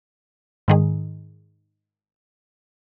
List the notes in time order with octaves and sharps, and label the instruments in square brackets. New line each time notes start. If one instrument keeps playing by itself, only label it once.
[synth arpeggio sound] G#2 D#3 G#4